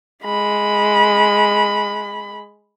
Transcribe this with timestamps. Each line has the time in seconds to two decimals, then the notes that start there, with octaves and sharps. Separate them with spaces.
0.24 G#3 B5